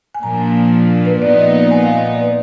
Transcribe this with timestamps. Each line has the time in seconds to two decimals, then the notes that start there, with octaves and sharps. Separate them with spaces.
0.15 G#5
0.23 A#2 F3 A#3 D4 A#5
1.05 B4
1.22 A#2 F3 B3 D#4 D5
1.38 D#5
1.54 D5
1.71 G#5
1.83 F5
1.95 D#5
2.15 D5
2.20 B4